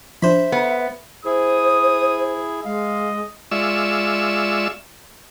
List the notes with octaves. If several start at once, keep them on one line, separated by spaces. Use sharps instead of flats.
F3 D4 C5 E5 B5
B3
E4 G#4 C5 D#6
G#3 D#5 F5
G#3 F4 D5 E5 C#6 E6